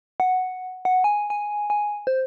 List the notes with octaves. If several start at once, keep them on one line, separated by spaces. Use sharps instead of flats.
F#5
F#5
G#5
G#5
G#5
C5